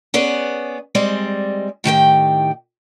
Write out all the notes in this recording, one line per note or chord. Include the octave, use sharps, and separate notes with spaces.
B3 C#4 G#4 D5
G3 G#3 C4 D5 D#5
A2 D#3 G4 G5